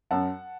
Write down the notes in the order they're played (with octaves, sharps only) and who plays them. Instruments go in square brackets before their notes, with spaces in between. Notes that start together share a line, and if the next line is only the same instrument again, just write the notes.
[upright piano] F#2 F#5 A5